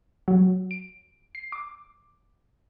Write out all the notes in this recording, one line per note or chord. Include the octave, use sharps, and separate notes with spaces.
F#3
D7
C7
D6